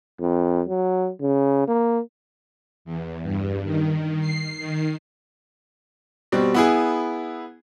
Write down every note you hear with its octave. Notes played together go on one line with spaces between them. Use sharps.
F2
F#3
C#3
A#3
E2
G2
D#3
C7
D#3
B2 G3 C4
B3 E4 G#4